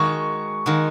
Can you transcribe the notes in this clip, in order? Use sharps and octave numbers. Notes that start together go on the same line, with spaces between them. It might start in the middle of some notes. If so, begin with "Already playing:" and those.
Already playing: D#3 G#3 D#4 F#4 C#6
D#3 G#3 D#4 F#4